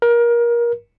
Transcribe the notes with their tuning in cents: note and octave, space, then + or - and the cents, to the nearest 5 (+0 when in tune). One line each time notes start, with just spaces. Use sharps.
A#4 +25